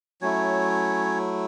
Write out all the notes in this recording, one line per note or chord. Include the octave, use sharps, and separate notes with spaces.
F#3 A3 C#4 E4 C#5